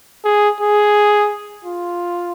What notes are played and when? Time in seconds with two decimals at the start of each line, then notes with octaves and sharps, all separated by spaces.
0.25 G#4
0.60 G#4
1.64 F4